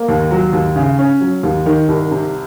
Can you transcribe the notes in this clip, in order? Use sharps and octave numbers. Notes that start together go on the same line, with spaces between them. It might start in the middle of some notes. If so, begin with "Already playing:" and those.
Already playing: A#3
D#2
F#3
D#2
C#3
C#4
F#3
D#2
D#3
C2
C3